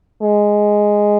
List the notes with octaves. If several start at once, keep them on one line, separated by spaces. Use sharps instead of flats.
G#3